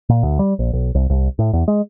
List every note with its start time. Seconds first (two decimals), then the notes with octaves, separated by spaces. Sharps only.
0.09 A#2
0.23 D2
0.39 G3
0.59 A#1
0.73 B1
0.95 C2
1.10 C2
1.39 A2
1.53 E2
1.68 G#3